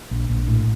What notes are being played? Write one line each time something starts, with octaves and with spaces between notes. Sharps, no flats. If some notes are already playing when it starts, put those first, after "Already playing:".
A#1
A#1
A2